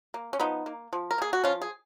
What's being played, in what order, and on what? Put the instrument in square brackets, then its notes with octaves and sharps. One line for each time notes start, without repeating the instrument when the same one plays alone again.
[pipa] A#3
C#4
F3 B3 D#4
A#3
F3
A#4
A#3 G#4
F#4
F3 C#4 F4
G#4